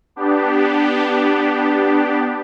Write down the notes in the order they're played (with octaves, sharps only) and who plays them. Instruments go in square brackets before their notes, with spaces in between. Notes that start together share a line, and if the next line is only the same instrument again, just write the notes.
[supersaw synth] B3 D4 G4